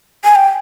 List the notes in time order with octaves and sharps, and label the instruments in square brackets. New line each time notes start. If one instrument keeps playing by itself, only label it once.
[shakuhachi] G#5
G5